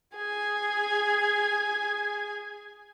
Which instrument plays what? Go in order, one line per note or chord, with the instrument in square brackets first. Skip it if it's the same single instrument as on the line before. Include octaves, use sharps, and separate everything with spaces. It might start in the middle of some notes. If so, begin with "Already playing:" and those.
[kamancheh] G#4 G#5